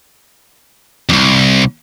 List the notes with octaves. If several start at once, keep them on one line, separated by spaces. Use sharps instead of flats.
C2 F2